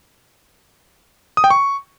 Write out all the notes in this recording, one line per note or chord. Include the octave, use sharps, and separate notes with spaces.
D#6
G5
C#6